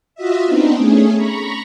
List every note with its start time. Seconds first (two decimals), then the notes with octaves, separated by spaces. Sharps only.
0.15 F4 F#4 D#5 E5
0.45 B3 C4 D4 D#4
0.77 A3 C#4 G#4
1.15 A#5 B5 C#6